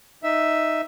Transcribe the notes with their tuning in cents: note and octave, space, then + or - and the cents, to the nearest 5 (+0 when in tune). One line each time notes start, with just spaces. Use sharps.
D#4 +0 E5 +0